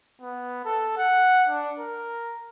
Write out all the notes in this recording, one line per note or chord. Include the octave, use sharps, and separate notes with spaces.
B3
A4
F#5
D4
A#4